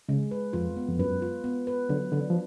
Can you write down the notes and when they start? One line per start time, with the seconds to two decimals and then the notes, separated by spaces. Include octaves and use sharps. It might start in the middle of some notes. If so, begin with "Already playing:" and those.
0.09 C#3 G#3
0.31 B4
0.53 F2 F4
0.76 B3
0.89 F2
0.99 F#2 B4
1.22 F4
1.44 B3
1.67 B4
1.89 D3 F#3
2.12 D3 D4
2.30 F3